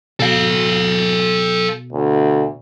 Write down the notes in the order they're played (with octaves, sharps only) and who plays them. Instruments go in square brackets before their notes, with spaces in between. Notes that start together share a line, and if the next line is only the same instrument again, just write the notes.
[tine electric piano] B2 [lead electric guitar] A4 F5
[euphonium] D2